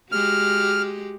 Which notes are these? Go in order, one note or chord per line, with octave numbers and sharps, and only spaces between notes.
G#3 F#4 G4 F6